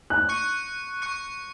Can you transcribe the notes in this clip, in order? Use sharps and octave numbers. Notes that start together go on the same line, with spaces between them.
F#6
C#6 F#6 C#7
C#6 F#6 C#7